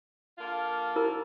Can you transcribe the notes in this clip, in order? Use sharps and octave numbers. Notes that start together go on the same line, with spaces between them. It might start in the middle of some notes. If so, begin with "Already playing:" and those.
D3 A#3 F4
E4 A#4